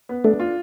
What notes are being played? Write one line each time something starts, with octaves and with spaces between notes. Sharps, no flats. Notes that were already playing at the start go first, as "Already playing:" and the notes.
B3
A3 D4
F4